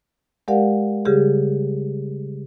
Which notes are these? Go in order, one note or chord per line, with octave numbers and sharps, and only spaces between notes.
G#3 G4 A#4 D5 F5 F#5
C#3 G3 G4 G#4